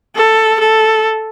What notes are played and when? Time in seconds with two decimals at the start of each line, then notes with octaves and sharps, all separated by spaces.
0.16 A4
0.60 A4